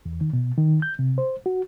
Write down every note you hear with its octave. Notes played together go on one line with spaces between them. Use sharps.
E2
D#3
B2
D#3
G6
C3
C5
F#4